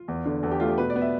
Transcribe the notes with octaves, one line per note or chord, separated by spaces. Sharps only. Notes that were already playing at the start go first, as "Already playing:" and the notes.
Already playing: F4
E2
D3
E2 A4
G4
A3 F4
G4
B2 B4
D5
B3
E5